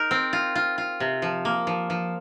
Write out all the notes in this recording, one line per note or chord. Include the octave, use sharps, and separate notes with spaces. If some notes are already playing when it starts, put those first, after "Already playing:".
Already playing: D#4 A#4
C4
F4
F4
F4
C3
F3
A#3
F3
F3